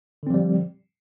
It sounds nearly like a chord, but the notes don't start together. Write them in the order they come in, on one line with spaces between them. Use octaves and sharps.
D3 C4 F3 G3